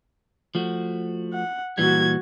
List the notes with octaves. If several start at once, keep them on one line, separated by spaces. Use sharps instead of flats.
F3 A3 F#4
F#5
A#2 E3 G3 F#4 G#6